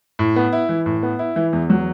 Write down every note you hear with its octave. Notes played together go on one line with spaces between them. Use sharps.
A2
B3
E4
E3
A2
B3
E4
E3
E2
F#3